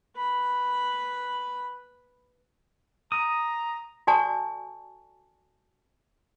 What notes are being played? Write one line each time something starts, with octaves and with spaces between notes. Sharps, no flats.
B4 B5
A#5 D#6
F#4 A4 D5 G#5 A5 C#6